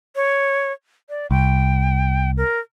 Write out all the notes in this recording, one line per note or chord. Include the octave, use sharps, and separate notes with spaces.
C#5
D5
C2 G5
A#4